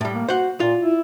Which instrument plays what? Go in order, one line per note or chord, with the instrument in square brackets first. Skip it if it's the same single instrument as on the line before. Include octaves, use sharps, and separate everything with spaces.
[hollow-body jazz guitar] A2 G3
[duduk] A#3
[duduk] F#4 [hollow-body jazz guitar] C5 F#5
[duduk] A#2 [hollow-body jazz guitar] F4
[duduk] E4